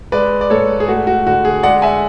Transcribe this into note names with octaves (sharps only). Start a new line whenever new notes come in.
G#3 B4 D5
D5
G#2 A4 C#5
G#4
A3 F#4
F#4
D3 F#4
G#4
G#3 D5 F#5
E5 G#5